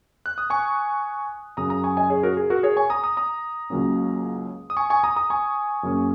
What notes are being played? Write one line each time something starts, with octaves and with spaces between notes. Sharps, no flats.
F#6
D#6
G#5 C#6
F#2 C#3 F#3 C#4 A#5 D#6
A#5 D#6
G#5 C#6
D#5 G#5
G#4 C#5
F#4 A#4
G#4
F#4 A#4
G#4 C#5
G#5 C#6
A#5 D#6
A#5 D#6
A#5 D#6
C#2 C#3 F#3 A#3 C#4
D#6
G#5 C#6
G#5 C#6
A#5 D#6
A#5 D#6
G#5 C#6
F#2 C#3 A#3 C#4